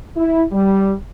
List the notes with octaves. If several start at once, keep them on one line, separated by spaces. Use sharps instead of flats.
E4
G3